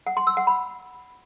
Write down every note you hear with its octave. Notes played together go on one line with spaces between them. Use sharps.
F#5
C6
E6
F#5
B5